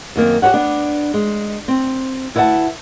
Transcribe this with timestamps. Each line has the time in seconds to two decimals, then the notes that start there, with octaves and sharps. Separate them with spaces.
0.16 F#2 D#3 A#3 C4
0.42 F#4 G4 B4 C#5 F#5
0.54 B3 D4
1.14 G#3
1.68 C4
2.35 D2 E4 B4 D5 F#5 A5